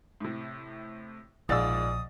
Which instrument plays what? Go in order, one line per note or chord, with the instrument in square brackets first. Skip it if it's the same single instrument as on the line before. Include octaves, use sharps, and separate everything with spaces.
[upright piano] A2 C3
[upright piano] E1 F4 A6 [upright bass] A#1 [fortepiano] G#2 D5 E6 [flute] D#6